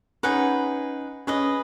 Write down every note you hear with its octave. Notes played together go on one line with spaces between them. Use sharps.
C#4 D#4 G#4 B4 F#5
C#4 G#4 B4 D#5